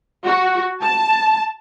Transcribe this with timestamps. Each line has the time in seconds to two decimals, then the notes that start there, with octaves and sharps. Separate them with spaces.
0.25 F#4
0.81 A5